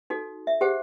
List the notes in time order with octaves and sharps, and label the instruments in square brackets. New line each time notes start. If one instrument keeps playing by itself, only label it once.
[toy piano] D#4 F#4 A4
E5
G4 G#4 C5 F#5